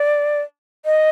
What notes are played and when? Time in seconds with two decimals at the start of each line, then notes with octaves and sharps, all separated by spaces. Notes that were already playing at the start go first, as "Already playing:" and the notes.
Already playing: D5
0.85 D#5